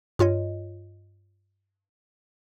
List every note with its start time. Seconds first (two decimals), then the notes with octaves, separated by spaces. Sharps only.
0.19 G2 F4 C#5 D#5